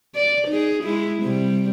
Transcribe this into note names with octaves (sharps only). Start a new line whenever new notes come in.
D5
D#4 G#4
G#3 E4
C3 G3